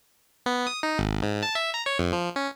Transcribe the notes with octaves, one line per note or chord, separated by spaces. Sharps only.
B3
D#6
D#4
G#1
G#2
A5
E5
A#5
C#5
F2
F3
C#4